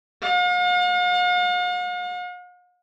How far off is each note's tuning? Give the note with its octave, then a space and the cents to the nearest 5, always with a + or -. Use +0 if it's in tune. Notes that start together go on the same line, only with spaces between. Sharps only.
F5 +45